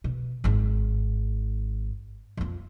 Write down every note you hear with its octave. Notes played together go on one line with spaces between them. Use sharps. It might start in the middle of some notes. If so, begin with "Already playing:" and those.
B2
G#1 G#2
F2 F4